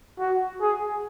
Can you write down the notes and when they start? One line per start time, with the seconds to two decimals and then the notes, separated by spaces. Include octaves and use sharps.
0.19 F#4
0.61 G#4